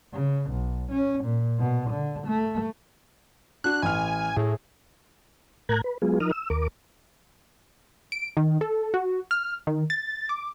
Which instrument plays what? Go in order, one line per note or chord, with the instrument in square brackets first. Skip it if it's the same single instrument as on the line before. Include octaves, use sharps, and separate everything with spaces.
[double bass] C#3
B1
C#4
A#2
B2
D3
A3
[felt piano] D4 F#4 [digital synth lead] F#6
[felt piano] A1 F6 [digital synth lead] G#5
[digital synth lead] A2 [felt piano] G#4
[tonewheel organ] A2 A#4 A#5 F#6 G#6
B4
F#3 G#3 B3 F4 G#4
F3 D#4 A#4 D#6 F6
E6
D#2 A#4 D6
[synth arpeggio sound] D7
D#3
A4
F#4
F6
D#3
A6
D6